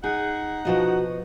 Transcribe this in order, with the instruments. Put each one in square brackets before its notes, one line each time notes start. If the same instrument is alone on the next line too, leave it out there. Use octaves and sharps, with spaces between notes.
[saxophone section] D#4 F#5 [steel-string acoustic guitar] G#4
[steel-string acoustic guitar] B2 F3 D#5 [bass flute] F#4